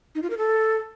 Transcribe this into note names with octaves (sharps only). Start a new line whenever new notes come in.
D#4
F4
A#4
A4